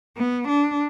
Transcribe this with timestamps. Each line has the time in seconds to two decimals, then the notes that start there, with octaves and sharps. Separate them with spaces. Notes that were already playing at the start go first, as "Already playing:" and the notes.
0.17 B3
0.48 D4